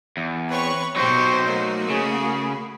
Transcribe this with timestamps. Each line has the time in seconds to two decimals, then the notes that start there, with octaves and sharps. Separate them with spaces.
0.17 E2
0.50 C4 B4 C#5 C#6
0.96 B2 F#3 D#4 G4 C5 C#6
1.46 A3 A#3 F#4 D#5
1.90 C#3 G#4
2.41 B5